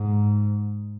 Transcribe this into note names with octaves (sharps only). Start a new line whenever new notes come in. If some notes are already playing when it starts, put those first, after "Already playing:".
Already playing: G#2